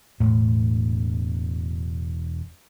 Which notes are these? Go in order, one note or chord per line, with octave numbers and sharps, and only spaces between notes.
E1 A2